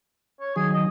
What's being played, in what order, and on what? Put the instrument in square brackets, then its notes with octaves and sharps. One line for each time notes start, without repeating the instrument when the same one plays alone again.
[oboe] C#5
[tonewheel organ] D#3 F#3 [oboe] G#4
[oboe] D#5